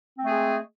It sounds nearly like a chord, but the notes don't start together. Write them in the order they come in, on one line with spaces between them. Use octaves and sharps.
C4 A3 G#4 G#3